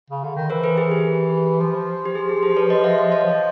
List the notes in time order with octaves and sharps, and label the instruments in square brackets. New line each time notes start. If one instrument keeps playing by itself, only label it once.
[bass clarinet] C#3
D3
D#3
[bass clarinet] E3 [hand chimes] A#4 C5
[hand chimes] A4 B4
G#4
G4
[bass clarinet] F3
[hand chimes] G4
G#4
G#4
G4 A4
B4 C#5
C#5 D#5
E5 F#5
D#5 F5
C#5 D#5
[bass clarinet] F3